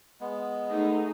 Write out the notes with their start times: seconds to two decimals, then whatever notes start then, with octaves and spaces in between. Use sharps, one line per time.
0.21 G#3 B3
0.70 A3 D#4 G#4